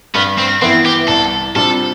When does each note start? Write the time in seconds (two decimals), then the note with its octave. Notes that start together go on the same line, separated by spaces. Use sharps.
0.15 G2 B3
0.38 C4
0.62 E3 B3 C4 E4
0.86 G4
1.08 C2 A4
1.56 C3 G3 D4 F4 A4